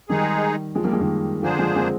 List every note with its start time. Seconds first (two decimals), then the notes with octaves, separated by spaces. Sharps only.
0.09 D#3 G3 G#3 D#4 G#4
0.75 F3 G#3
0.84 G3 A#3
0.92 F3 G#3
1.00 D#3 G3
1.42 D3 F3 A#3 D4 G#4 C5
1.59 F3 G#3
1.75 G#3 C4